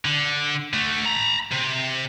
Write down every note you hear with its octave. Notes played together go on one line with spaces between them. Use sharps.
D3
A3 F#4
A#5 B5
C3